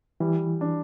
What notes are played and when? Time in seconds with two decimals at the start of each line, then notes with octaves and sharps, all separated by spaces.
0.20 E3 G3
0.61 D4